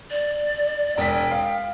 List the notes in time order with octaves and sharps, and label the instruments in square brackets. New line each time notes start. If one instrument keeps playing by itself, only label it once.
[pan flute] D5
[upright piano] E1 B6 [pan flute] G5
[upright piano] F5